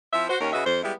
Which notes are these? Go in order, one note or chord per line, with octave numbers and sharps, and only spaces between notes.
F3 C4 E4 E5
F#4 C5
D#2 D#3 C#4 A#4 C#5
C#3 F#4 B4 D#5 E5
F2 C5
G3 G#3 B3 E4